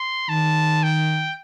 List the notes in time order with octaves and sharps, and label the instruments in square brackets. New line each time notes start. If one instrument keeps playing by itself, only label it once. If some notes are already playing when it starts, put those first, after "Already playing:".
Already playing: [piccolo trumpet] C6
[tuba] D#3 [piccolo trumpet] A5
[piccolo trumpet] G5